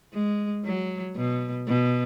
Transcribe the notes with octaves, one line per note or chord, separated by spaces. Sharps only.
G#3
F#3
B2
B2